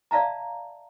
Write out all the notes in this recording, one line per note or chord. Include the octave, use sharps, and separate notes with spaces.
D5 E5 F5 A5 A#5